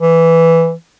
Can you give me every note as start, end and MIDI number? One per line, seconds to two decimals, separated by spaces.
0.01 0.73 52